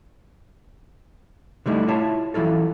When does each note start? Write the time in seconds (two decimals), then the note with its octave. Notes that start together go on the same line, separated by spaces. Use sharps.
1.66 D3 G3 A3 D#4 E4
1.88 E4 F4 C#5 E5 A5
2.34 E3 F#3 E4 F4 A4